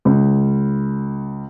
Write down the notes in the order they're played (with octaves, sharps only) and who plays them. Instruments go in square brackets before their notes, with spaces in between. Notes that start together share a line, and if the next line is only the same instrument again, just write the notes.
[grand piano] C#2